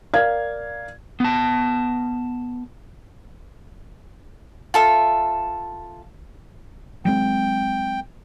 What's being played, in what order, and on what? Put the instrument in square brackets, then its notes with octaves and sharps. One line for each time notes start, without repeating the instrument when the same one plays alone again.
[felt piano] A#4 D5 F5 G#6
[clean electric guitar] B3 A5
[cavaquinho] F4 A4 E5
[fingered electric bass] F#3 G#3 C4 [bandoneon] G5